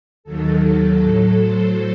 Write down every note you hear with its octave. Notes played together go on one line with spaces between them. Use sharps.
D#2 D#3 F#3 A4
A4
A2 F#3
C5